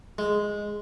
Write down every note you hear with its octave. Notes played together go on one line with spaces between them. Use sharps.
G#3